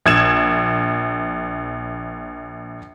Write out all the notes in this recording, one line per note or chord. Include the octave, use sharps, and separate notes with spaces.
A#1 G#6 E7